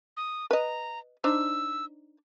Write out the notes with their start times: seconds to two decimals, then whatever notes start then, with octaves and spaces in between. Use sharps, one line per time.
0.17 D#6
0.51 B4 D#5 A#5
1.24 D4 D#4 C5 E6